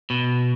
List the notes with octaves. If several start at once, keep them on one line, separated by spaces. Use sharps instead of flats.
B2